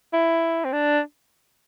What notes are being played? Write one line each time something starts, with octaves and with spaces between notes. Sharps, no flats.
E4
C4
D4